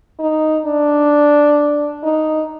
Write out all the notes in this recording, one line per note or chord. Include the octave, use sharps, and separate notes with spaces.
D#4
D4
D#4